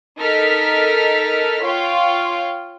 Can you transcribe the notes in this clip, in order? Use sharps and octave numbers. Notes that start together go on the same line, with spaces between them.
D#4 A4 A#4 F6 B6
F4 C#5 F5 G5